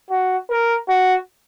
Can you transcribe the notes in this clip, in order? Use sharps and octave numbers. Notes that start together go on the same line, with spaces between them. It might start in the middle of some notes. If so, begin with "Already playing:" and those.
F#4
A#4
F#4